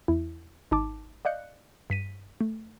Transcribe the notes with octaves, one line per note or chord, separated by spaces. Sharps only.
E2 E4
G#1 D#4 A5 D6
D5 D#5 F5 F#6 G6 C#7
G2 B6 D#7
A3